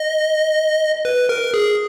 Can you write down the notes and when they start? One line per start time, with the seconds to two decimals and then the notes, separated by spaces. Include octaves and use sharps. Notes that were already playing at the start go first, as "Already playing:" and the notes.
Already playing: D#5
1.05 B4
1.29 A#4
1.54 G#4